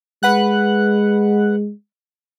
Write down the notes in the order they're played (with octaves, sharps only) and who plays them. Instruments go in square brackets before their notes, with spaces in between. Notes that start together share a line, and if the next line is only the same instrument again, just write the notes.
[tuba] G#3 [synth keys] B4 F#5 F#6